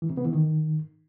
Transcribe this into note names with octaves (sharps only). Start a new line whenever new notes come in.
E3
C3
B3
E3
D#3